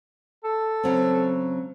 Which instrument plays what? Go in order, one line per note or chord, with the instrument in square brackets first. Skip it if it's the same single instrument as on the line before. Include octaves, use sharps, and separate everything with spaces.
[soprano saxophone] A4
[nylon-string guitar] C#3 F#3 C4